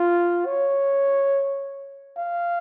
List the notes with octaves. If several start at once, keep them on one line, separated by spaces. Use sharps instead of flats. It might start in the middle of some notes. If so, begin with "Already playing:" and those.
Already playing: F4
C#5
F5